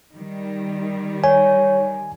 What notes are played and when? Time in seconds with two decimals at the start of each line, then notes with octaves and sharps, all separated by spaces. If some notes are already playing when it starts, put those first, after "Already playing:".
0.15 D#3 G3
1.24 C#5 G#5